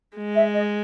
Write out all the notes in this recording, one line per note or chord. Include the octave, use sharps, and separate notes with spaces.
G#3
E5
D#5